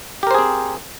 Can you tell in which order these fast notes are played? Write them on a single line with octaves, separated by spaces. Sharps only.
G4 A#4 C5 G#4 C4